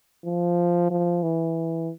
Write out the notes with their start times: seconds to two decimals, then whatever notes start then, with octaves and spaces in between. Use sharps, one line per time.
0.25 F3
0.90 F3
1.23 E3